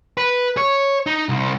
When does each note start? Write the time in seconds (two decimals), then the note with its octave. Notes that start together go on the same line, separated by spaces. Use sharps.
0.17 B4
0.57 C#5
1.06 D#4
1.29 C2